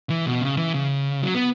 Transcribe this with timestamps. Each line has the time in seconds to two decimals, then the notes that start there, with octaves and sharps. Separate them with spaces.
0.10 E3
0.26 B2
0.41 C#3
0.57 E3
0.74 C#3
1.22 F#3
1.35 B3